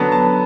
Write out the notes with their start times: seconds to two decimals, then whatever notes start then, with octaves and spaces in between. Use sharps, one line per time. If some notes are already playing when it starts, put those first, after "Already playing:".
Already playing: D3 F#3 B3 A5
0.12 A5